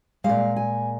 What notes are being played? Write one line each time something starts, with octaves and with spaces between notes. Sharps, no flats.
A#2 G#3 F5
G#5